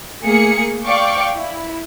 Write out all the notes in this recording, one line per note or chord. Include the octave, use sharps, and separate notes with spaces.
A3 A#3 G#4 C#7
D5 F5 G5 C#6 D6
E4